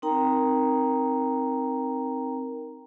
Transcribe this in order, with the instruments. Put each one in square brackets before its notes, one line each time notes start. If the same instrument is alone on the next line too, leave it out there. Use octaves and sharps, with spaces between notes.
[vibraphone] C4 D#4 A#4 G5 A#5